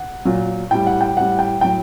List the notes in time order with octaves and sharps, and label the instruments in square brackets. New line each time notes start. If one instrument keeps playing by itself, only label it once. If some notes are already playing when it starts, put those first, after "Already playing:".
Already playing: [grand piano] F#5
A#2 F#3
A2 G3 G5
F#5
G5
A2 G3 F#5
G5
A2 F#3 G5